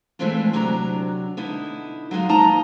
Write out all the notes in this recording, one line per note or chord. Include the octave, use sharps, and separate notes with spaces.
E3 F3 G#3 A3 C4 D4
D2 C3 F#3 D4 A#5
B2 D3 D#4 E4
F#3 G#3 D#4 F4
D#3 F3 A#3 D#4 A5 A#5